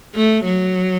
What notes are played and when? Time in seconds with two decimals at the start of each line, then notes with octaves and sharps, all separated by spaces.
0.15 A3
0.45 F#3